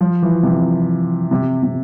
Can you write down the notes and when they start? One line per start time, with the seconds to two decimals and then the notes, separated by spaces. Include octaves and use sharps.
0.01 F3
0.22 E3
0.43 C3
1.31 C3
1.63 C3